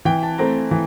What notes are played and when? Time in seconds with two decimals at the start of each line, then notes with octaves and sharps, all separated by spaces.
0.05 E3 G5
0.23 A5
0.38 A3 C4 A#5
0.71 E3